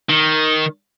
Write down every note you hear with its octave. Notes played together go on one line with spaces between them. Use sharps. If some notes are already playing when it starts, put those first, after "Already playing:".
D#3